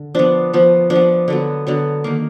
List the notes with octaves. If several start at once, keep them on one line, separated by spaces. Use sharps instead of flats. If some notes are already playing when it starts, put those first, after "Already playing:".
Already playing: D3
F3 B3 D4
F3 B3
F3 D4
B3
D3 F#3 B3
D3 F#3 B3
D#3 A#3